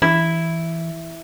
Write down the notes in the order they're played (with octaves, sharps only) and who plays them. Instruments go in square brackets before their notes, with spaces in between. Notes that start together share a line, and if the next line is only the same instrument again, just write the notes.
[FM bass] E3 [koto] E4